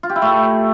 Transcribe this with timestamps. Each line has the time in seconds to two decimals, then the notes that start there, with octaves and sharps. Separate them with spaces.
0.03 F4
0.09 G4
0.16 E4
0.22 A3